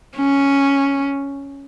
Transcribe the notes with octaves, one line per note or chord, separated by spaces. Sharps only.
C#4